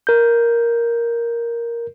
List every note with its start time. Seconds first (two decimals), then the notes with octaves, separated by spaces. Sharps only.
0.07 A#4 G6